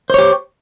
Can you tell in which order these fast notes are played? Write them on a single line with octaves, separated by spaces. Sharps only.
C5 C#5 G4